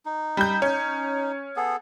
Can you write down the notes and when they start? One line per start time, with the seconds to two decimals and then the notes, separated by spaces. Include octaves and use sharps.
0.06 D#4
0.37 G3 G6
0.62 C#4
1.56 B3 G#4 A4